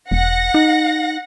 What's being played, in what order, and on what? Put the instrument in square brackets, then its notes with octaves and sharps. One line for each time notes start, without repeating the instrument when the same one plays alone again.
[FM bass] E1 [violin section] F#5 A#6
[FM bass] D#4